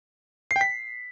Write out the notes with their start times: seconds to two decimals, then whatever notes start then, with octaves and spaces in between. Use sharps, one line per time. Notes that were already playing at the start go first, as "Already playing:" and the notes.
0.51 C7
0.56 G5
0.61 B6